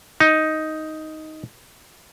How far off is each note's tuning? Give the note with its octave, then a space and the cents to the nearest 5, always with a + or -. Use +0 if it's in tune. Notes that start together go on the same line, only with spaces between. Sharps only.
D#4 +5